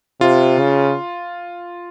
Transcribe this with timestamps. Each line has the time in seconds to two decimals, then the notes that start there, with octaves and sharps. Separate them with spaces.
0.21 C3 F4
0.60 C#3